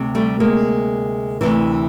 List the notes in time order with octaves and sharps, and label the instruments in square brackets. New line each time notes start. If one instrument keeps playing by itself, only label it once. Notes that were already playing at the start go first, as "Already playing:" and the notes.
Already playing: [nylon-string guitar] D2 C3
G3 A3
G#3 A#3
D2 C3 E3